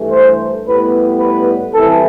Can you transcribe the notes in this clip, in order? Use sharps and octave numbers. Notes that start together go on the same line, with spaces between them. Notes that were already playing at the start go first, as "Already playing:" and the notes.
Already playing: G2 E3 A3
C5
A2 G3 B3 B4
B4
C2 C3 E3 A4